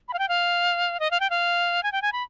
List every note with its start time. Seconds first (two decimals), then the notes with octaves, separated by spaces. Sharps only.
0.09 B5
0.13 F5
0.19 G5
0.29 F5
1.00 D#5
1.11 F5
1.20 G5
1.30 F5
1.83 G#5
1.92 G5
2.02 G#5
2.12 B5